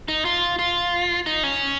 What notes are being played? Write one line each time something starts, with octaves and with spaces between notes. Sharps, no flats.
D#4
F4
F4
D#4
C#4